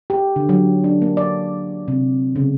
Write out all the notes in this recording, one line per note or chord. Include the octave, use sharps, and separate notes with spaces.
G4
D3
F#3
D4
A#3
D5
C3
C#3